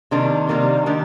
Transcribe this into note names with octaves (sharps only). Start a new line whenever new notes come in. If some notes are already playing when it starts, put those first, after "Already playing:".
C3 D#3 G3 A#3 D4
C3 D#3 G3 A#3 D4
D#3 G3 D4 G4